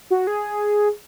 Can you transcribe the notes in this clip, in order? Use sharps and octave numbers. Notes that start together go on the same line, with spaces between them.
F#4
G#4